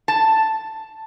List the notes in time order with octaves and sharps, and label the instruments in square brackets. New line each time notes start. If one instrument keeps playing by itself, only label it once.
[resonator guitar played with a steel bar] A5